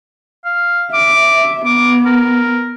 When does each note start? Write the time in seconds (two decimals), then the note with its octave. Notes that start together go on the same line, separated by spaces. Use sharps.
0.45 F5
0.93 E5 D6
1.66 B3 D6
2.06 A#4